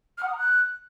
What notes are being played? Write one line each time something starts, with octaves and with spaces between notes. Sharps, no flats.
F6
F#5
D#6
A#5
F#6